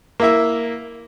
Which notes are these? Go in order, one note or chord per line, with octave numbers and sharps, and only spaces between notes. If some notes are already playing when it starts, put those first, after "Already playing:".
A#3 E4 E5